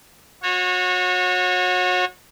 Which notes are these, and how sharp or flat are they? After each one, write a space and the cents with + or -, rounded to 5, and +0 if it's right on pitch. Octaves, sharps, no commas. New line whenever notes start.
F#4 -30 C#5 -20